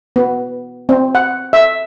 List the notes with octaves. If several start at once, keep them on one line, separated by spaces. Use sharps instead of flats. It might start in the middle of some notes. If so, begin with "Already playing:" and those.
B3
C4
F#5
E5